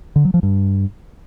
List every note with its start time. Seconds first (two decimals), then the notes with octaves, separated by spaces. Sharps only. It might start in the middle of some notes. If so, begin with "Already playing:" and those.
0.16 D3
0.25 F#3
0.34 F3
0.43 G2